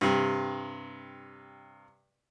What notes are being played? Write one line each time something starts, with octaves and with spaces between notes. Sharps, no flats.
G2 C3